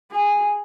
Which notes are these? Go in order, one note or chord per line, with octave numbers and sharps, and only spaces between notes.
G#4